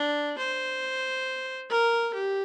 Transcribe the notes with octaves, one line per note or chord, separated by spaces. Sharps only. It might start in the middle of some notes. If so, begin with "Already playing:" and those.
Already playing: D4
C5
A#4
G4